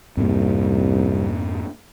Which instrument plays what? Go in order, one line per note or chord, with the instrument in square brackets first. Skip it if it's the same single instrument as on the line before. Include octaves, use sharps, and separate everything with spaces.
[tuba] C2 [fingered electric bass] F2 G#2 A#3